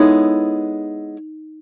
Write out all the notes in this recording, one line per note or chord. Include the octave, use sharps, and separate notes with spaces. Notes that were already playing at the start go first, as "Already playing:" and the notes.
Already playing: G#3 B3 D#4 E4 A4 C#5